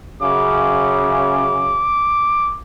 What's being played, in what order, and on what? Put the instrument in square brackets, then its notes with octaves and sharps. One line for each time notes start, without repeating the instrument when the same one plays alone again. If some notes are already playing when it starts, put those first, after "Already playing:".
[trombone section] F#2 C#3 [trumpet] D6